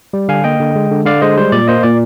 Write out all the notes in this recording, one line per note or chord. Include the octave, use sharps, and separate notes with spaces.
G3
D3 F5 G#5
A#3 D#5 G5
D3
G#3
D3
D3 D5 F5
G#3 C5 D#5
G3 C5
A#2 D5
A#3 C5 D#5
A#2 D5